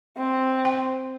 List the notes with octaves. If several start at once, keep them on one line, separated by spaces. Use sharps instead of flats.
C4
G5